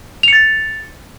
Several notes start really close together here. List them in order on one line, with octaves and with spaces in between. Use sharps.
F7 C#7 A6